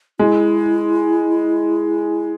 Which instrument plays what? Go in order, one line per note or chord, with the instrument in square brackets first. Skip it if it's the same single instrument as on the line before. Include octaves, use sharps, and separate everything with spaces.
[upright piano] G#3 [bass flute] E4